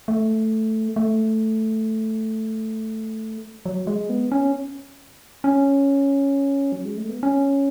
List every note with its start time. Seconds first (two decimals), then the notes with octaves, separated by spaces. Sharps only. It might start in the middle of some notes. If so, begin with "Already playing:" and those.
0.08 A3
0.96 A3
3.66 F#3
3.87 G#3
4.09 B3
4.32 C#4
5.44 C#4
6.72 F#3
6.85 G#3
6.97 A3
7.09 B3
7.23 C#4